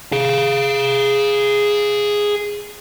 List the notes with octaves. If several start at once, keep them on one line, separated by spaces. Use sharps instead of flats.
G#4 F5